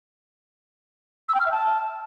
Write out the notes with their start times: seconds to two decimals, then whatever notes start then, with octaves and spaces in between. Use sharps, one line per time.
1.29 E6
1.34 G5
1.40 F6
1.46 E5
1.52 A5